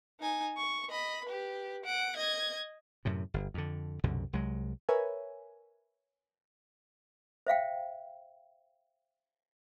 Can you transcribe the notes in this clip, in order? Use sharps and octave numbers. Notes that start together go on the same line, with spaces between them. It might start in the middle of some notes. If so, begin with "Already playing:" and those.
D#4 G#5
C#6
D#5 B5
G4 B4
F#5 D7
D#5 G#6
F#2 A2 C3
G1
F2 D3
C2 F#2 B2 D3
C2 F#3 G#3
A#4 B4 C#5 E5 G#5
C5 E5 F5 G5